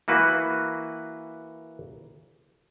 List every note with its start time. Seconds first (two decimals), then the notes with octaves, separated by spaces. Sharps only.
0.08 E3 A#3 F#4 B4